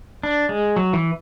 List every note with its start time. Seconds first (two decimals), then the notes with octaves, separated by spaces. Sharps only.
0.23 D4
0.49 G#3
0.76 F#3
0.93 E3